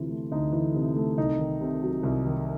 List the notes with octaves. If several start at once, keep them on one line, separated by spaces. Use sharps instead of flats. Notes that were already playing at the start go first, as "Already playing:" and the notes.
Already playing: D2 C3 E3 F4
A3
D2 D#4
E3
C3
A3
C2 D#4
D#3
C3
F#3
C2
D#3